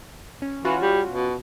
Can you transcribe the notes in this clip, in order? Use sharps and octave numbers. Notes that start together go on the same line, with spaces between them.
C#4
E3 C#4 F4 F#4
G3
B2